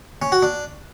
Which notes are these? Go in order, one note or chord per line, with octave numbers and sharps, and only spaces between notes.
C#4
F#4
D4